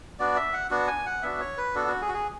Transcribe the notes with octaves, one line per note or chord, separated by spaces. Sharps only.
B3 D4 F#4 D5
E5
F#5
B3 D4 F#4 F#5
G#5
F#5
B3 D4 F#4 E5
C#5
B4
B3 D4 F#4 A4
F#4
G#4
F#4
G#4